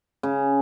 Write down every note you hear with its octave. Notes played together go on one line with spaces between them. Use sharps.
C#3